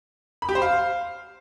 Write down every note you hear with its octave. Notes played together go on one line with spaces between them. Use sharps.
B5
G4
C5
F5